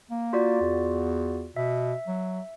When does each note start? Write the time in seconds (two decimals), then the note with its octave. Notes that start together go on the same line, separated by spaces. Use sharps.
0.11 A#3
0.33 F4 F#4 D5
0.61 E2
1.56 B2 E5
2.08 F#3